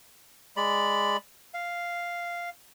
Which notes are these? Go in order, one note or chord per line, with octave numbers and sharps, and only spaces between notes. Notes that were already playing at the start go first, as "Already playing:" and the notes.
G#3 D5 B5
F5